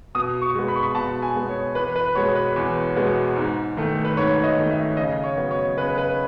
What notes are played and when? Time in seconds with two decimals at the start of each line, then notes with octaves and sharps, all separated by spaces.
0.15 B2 D#6
0.42 C#6
0.55 G#3 B3
0.68 B5
0.76 C#6
0.83 B5
0.95 B2 A5
1.22 G#5
1.36 G#3 B3
1.49 C#5
1.75 E2 B4
1.96 B4
2.15 B2 G#3 B3 C#5
2.35 B4
2.56 E2
2.96 B2 G#3 B3
3.36 G#2
3.77 D#3 A3
4.05 B4
4.17 G#2 C#5
4.36 C#5
4.44 D#5
4.58 D#3 A3
4.71 E5
4.97 C#3 D#5
5.24 C#5
5.37 F#3 B3
5.51 C#5
5.77 C#3 B4
5.98 B4